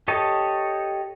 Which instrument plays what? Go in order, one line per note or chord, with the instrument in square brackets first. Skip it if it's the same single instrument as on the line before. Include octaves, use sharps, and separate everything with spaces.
[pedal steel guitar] G4 A4 C#5 D#5 A5